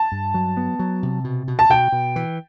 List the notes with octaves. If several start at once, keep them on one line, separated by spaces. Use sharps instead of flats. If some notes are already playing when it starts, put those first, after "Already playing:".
Already playing: A5
G2
F#3
B3
F#3
C3
B2
B2
A5
B2 G5
B2
E3